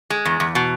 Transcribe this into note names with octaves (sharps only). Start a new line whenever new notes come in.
G#3
E2
E2
B2